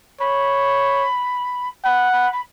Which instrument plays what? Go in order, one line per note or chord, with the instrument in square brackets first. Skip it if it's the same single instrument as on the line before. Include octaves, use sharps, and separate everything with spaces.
[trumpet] C#5 [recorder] B5
[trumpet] F#5 [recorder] B5
[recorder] B5
B5